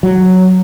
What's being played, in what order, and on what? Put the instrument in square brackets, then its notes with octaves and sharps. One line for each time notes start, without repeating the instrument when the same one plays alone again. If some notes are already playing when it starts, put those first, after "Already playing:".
[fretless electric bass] F#3